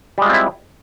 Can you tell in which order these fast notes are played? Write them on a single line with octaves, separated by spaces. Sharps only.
G3 G#3 F4 C4 E4